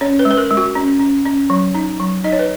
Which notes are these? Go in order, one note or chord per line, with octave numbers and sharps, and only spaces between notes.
C#4 C#5
B4
G#3
B4
A#4
G#3
F#4
C#4
C#4
C#4
F#3
D#4
F#3
D#4 D#5
C#5
B4